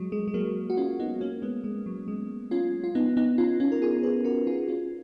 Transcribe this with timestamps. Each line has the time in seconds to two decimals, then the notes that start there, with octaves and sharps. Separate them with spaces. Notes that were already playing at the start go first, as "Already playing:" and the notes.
Already playing: F#3 G#3
0.12 G#3
0.28 G#3
0.34 F#3 A#3
0.70 F#4
0.77 C#4 F4
0.99 B3 D#4
1.21 A#3 C#4
1.42 G#3 B3
1.64 G#3
1.86 F#3
2.08 G#3
2.51 C#4 F4
2.84 F4
2.95 B3 D#4
3.17 B3 D#4
3.38 C#4 F4
3.60 C#4 F4
3.72 A#4
3.82 F4 G#4
4.03 G#4 B4
4.24 F#4 A#4
4.47 F4 G#4
4.68 C#4 F4